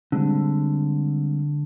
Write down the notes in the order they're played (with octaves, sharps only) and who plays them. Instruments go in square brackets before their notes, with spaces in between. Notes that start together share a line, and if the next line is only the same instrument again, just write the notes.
[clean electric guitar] D3 [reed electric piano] G3 G#3 C4